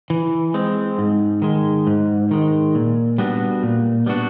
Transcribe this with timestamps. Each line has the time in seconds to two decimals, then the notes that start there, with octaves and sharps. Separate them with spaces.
0.10 E3
0.54 G#3 C4
0.98 G#2
1.42 D#3 G#3
1.87 G#2
2.31 D#3 G#3
2.75 A#2
3.18 G3 B3 D4 F#4
3.63 A#2
4.06 G3 B3 D4 F#4